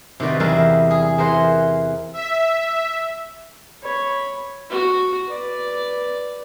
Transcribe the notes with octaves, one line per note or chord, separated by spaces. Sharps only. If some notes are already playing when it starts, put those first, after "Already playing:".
C3 D#3 F#4 B4 D5
E2 G3 E4 A#4 F5
G#4
E3 A#4 C5 F#5 C6
E5
C#5 B5
F#4
B4 D5